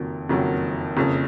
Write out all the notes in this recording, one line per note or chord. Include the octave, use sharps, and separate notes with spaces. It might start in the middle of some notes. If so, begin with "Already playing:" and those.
Already playing: F#1 F2 D#3 F#3
F#1 F2 D#3 F#3
F#1 F2 C#3